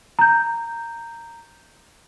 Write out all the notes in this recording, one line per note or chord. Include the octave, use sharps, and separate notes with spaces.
A#5 G6